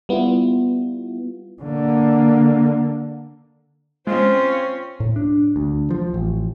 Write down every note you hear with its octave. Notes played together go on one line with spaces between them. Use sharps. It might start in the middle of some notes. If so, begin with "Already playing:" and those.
G3 B3 E4 F4
D3 A#3
G#3 C4 C#4 F4 C5
A2
D4
D2
F3
A1